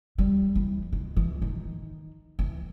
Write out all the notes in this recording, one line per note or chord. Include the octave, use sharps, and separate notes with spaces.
G3
E3
D#3
E3
D#3
E3